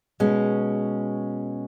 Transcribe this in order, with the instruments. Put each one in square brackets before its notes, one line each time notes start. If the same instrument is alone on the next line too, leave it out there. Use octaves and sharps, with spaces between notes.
[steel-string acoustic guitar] B2 G#3 C#4